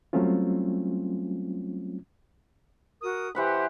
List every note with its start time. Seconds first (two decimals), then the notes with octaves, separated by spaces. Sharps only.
0.13 F#3 G3 A3 C4 C#4 F4
3.02 F#4 A#4 D#6
3.35 E3 G4 C5 F#5 B5